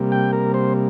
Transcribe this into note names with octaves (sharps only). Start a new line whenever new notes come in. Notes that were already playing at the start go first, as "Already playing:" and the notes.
Already playing: C3 G3 A#3
G5
A#4
C5